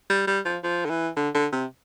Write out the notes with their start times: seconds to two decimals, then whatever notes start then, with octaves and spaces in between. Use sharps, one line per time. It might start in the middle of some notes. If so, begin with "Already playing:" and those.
0.10 G3
0.27 G3
0.45 F3
0.63 F3
0.85 D3
0.90 E3
1.16 D3
1.35 D3
1.52 C3